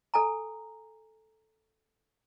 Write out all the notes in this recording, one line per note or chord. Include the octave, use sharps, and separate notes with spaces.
A4 G#5 A#5